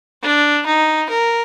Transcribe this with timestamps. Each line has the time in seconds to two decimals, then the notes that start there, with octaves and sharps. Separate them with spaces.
0.22 D4
0.66 D#4
1.10 A#4